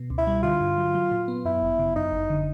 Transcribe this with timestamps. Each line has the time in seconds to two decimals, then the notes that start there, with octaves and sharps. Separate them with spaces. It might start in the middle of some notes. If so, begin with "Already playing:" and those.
Already playing: B2
0.10 C#2
0.18 E4
0.27 G3
0.43 D3 F4
0.61 G2
0.78 F#3
0.95 F#3
1.11 A#2
1.28 B3
1.45 F#2 E4
1.62 G1
1.79 C#3
1.96 F#2 D#4
2.12 G1
2.30 D3